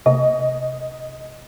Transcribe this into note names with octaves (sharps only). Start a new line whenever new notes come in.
C3 D#5